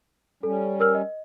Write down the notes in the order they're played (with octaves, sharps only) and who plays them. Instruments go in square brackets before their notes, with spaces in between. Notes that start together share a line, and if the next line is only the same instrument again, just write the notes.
[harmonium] G3 C#4 [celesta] A4
[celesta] A#4 E6 F6
D#5